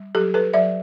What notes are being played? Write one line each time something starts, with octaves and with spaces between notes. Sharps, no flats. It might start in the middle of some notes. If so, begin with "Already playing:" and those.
Already playing: G3
F#3 G4 A4
A4 B4
F#3 D5 E5